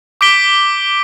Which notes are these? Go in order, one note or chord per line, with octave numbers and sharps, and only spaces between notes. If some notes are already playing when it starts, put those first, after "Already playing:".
D6 G6 B6 D7 G7